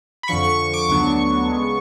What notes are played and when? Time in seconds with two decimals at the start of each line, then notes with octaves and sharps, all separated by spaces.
0.23 B5
0.28 F2 D3 F3 C#6
0.43 C#6
0.59 C#6
0.74 D6
0.89 D2 D3 F#3 B3 D4 C#6
1.50 C#3 G#3 B3